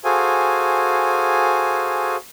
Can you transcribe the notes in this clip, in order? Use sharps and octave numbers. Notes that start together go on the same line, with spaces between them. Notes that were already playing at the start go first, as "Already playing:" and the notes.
F#4 G#4 A4 C5 F5 G#5